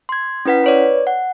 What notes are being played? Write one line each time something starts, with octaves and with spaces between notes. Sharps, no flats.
C6 G#6
C#4 E4 B4 F#5 B6
B4 C#5 D5
F#5